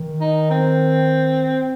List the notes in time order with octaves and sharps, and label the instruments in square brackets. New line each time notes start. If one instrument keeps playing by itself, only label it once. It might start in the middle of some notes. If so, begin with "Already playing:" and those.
Already playing: [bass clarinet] D#3
[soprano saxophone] D#4
C4